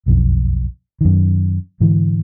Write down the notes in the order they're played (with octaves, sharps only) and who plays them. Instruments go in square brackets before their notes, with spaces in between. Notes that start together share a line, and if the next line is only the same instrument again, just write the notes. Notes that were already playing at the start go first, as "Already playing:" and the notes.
[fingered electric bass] F#1 B1 F2
F#2 D#3
G#2 D3 E3